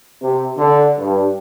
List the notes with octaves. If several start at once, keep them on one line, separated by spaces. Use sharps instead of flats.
C3
D3
G2